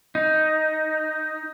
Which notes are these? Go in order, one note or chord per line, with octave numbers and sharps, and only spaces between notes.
D#4